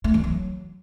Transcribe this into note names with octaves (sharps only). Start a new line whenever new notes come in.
A3
E3
F#3